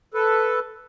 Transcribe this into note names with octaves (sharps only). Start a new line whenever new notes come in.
A4 B4